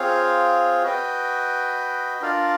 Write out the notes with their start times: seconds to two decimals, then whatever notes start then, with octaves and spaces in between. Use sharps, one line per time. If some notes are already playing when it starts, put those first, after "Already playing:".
Already playing: C4 F4 G#4 C#5 F5
0.83 F#4 B4 D#5 G5
2.21 D4 F4 A#4 D5 F5